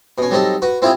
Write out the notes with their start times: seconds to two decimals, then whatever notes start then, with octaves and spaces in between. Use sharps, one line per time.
0.18 B2 C#4
0.31 F#3 G3 C4 D#4 A4
0.62 F#4 B4
0.82 C4 E4 F4 G4 G#4